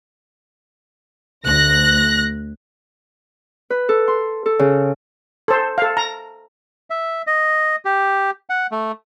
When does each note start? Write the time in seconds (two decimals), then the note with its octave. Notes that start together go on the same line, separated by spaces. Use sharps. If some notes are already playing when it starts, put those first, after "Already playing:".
1.44 D2 F#6 A#6
3.70 B4
3.89 A4
4.08 C6
4.46 A4
4.59 C#3
5.48 A4 C5
5.78 A4 F5
5.97 A#5
6.90 E5
7.27 D#5
7.85 G4
8.50 F#5
8.72 A3